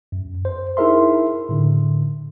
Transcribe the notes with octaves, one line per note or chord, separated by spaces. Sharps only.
F#2
C5
D#4 E4 G#4 A#4 E5 C6
A2 D3